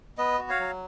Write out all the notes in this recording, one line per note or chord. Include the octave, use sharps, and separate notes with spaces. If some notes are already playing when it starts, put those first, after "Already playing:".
B3 B4 D#5
F#4
C#5 F5
F#3